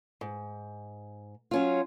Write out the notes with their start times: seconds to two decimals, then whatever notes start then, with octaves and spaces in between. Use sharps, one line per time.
0.21 G#2
1.51 F#3 C#4 F4